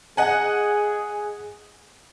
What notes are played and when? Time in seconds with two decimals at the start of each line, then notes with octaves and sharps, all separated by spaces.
0.17 G#4 D#5 F#5 G#5